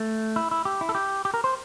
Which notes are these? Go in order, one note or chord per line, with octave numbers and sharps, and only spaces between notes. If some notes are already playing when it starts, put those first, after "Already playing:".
Already playing: A3
E4
E4
G4
E4
A4
G4
G4
A#4
C5